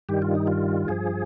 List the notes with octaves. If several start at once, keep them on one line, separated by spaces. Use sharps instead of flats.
G2 D#3 G3 G4
F4
D#4
F4
G2 F3 G#4